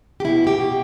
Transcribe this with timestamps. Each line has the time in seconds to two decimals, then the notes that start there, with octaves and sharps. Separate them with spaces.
0.20 G4
0.24 B2 E4
0.47 G4
0.58 B2